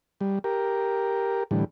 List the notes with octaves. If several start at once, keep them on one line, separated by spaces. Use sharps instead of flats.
G3
G4 A#4
A2 D3 E3 G3